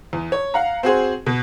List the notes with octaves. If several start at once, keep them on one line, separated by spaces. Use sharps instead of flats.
E2
C#5
F5 F#5 A#5
C4 F#4 G#4 C5
B2